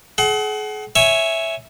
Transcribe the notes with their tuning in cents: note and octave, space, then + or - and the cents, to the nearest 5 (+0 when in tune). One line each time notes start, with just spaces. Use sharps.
G#4 +40 F#5 +30
C#5 +0 E5 +0 G#5 +10